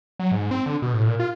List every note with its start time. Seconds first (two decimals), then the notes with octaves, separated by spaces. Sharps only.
0.19 F#3
0.32 G#2
0.51 C4
0.66 D3
0.82 B2
0.94 A2
1.07 A#2
1.19 F4